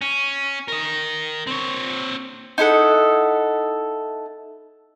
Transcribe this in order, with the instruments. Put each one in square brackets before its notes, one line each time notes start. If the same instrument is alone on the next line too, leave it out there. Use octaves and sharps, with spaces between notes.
[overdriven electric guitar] C#4
A#4 D#5
C4 C#5
[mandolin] D#4 E4 A4 F#5